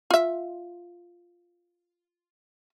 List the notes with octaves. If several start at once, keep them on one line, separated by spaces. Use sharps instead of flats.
F4 E5